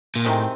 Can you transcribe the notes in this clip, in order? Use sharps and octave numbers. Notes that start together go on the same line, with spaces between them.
A#2
A2 C3 D#3 G#3 C4